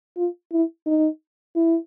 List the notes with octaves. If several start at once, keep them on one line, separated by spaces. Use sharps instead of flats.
F4
E4
D#4
E4